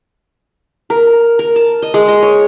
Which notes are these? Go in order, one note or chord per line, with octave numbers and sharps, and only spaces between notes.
A#4
A#4
A5
D#5
G#3
D#5
C#5